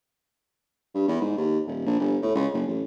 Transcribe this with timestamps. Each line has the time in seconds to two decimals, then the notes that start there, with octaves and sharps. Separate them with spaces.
0.94 G2
1.08 E2
1.21 G#2
1.37 D#2
1.67 D#1
1.86 A#1
1.99 G1
2.22 A2
2.35 C#2
2.53 F#1
2.67 A1